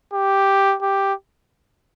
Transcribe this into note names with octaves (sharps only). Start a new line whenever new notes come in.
G4
G4